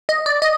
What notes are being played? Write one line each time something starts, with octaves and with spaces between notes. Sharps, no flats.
D#5
D5
D#5